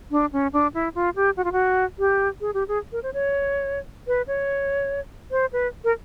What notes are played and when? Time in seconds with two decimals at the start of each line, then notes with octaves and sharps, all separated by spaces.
0.11 D4
0.33 C#4
0.53 D4
0.74 E4
0.95 F4
1.16 G4
1.37 F#4
1.44 F4
1.52 F#4
1.99 G4
2.41 G#4
2.54 G4
2.68 G#4
2.92 A#4
3.03 C5
3.14 C#5
4.08 B4
4.27 C#5
5.31 C5
5.53 B4
5.84 A#4